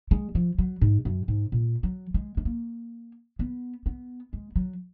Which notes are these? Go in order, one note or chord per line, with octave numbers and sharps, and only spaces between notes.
G#3
F3
F#3
G#2
F#2
G#2
A#2
F#3
G#3
G#3
A#3
B3
B3
G#3
F#3